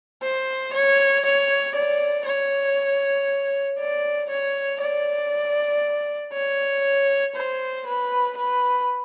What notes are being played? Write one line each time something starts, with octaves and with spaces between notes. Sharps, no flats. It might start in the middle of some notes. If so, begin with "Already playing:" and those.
C5
C#5
C#5
D5
C#5
D5
C#5
D5
C#5
C5
B4
B4